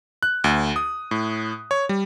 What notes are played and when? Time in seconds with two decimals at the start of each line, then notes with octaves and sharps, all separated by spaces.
0.23 F#6
0.44 D2
0.76 D#6
1.11 A2
1.71 C#5
1.89 G3